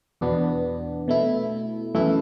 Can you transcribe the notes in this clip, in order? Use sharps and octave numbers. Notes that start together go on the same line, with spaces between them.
E2 B2 B3 D4
B2 A3 E4
F#2 E3 A3 E4